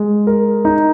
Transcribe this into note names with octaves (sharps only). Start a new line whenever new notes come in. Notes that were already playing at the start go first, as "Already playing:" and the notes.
Already playing: G#3
A#4
D#4